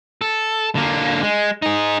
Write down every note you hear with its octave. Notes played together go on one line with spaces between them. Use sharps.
A4
D3 A#3
G#3
D#4 G#4